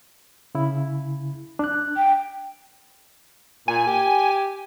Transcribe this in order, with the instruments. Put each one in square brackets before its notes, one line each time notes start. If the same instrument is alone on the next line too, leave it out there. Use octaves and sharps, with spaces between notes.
[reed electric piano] C#3 E4
D4 F#6
[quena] G5
[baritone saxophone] A#2 [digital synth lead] G#5
[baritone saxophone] G4